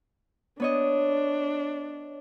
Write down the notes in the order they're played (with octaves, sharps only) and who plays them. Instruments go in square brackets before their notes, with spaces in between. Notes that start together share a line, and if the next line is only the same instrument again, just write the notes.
[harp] B3 C#5 D#5 [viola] D4